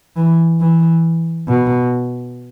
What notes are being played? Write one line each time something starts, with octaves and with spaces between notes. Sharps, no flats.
E3
E3
B2